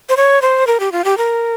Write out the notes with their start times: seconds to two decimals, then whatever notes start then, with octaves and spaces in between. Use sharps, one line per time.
0.09 C5
0.17 C#5
0.42 C5
0.67 A#4
0.80 G4
0.92 F4
1.05 G4
1.18 A#4